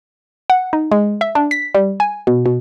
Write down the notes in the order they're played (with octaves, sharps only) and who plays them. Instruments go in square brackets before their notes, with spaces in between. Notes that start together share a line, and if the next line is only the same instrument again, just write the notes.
[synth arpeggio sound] F#5
D#4
G#3
E5
D4
B6
G3
G#5
B2
B2